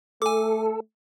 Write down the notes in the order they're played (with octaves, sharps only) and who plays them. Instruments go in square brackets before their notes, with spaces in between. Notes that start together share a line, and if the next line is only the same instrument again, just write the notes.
[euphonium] A3 [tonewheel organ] A4 [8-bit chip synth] G#5 D6